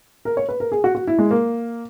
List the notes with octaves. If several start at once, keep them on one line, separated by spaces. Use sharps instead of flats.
A#4
C#5
B4
A#4
G#4
F#4
F#4
E4
G#3
A#3